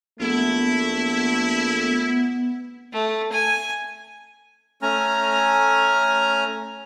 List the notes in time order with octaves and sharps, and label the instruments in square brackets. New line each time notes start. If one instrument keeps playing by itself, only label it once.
[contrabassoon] A#1 [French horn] A3 [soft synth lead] B3 [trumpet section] E4
[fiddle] A3
G#5
[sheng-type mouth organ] A3 C#4 G#5 A#5 F6